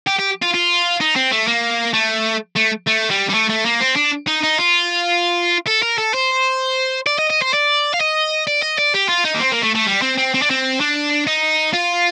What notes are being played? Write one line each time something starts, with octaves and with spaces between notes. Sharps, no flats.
G4
G4
F4
F4
D#4
C4
A3
A#3
A3
A3
A3
G3
G3
A3
A3
A#3
C4
D4
D#4
D#4
F4
A4
A#4
A4
C5
D5
D#5
D#5
C5
D5
F5
D#5
D5
D#5
D5
G4
F4
D#4
A#3
C4
A#3
A3
A3
G3
C4
C4
C4
D4
C4
D4
D#4
F4